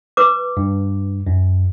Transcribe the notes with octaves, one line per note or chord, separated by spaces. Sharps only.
B4 D6
G2
F#2